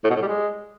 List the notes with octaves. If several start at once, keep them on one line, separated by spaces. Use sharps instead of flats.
A2
B2
A2
G3
G#3